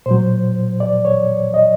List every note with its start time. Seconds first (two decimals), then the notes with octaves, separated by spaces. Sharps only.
0.06 A#2 F#3 C5
0.80 D5
1.05 C#5
1.54 D#5